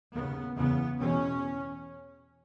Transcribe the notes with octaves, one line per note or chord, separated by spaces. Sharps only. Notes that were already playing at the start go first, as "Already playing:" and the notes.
D#2 C#3 B3
E2 C#3 B3
E2 B2 C#4